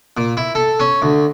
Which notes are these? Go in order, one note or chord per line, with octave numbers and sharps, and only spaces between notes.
A#2
E4
A4
C#4
D2